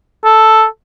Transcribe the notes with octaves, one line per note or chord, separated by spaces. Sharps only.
A4